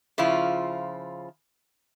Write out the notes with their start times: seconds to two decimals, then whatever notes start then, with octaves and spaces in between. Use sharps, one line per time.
0.18 C#3 F3 E4 F4